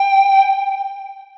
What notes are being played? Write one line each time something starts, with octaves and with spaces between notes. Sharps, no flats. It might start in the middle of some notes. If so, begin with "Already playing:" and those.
Already playing: G5